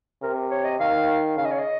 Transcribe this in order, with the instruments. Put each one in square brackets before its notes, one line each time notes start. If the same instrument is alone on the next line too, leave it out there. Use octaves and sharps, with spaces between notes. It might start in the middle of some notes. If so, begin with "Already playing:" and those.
[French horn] C3 [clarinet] A#4
[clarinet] C#5
D#5
[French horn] D#3 [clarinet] F5
[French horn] C#3 [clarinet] F5
[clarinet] D#5
C#5
D#5